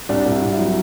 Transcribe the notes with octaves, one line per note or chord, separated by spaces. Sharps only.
C2 D4
C2
E4
C2
E4
F#3